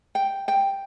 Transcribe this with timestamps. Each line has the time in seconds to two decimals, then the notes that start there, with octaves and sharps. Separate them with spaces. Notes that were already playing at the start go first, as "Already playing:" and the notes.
0.15 G5
0.48 G5